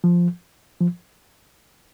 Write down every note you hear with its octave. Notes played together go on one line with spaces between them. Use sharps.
F3
F3